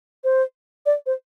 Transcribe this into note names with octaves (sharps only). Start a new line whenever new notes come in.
C5
D5
C5